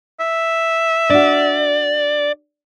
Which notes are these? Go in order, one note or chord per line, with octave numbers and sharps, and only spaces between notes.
E5
D4 F#4 D5